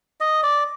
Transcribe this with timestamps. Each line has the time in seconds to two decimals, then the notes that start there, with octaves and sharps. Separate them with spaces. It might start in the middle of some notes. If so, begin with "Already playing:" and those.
0.20 D#5
0.43 D5